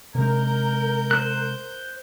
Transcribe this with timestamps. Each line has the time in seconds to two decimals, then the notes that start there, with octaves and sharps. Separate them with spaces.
0.15 C3 G#3 A#4 G6
1.11 C5 F#6